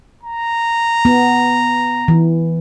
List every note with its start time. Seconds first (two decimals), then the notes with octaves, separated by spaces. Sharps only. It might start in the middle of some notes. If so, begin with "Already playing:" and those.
0.24 A#5
1.05 B3
2.08 E3